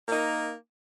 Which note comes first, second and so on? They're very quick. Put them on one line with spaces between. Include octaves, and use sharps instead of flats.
A#3 A#4 D#4